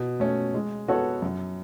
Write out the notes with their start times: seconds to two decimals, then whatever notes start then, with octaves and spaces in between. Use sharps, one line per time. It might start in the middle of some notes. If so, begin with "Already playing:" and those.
Already playing: B2
0.20 A3 C#4
0.54 G#3
0.88 B3 F#4 A4 C#5
1.22 F#2